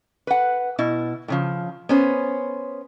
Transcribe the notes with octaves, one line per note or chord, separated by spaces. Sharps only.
B4 F#5
B2 E4
A2 C#3 F3
B3 C#4 C5